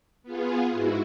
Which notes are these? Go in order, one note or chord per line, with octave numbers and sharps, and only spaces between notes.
B3 F4 G#4
G#2 E4 F#4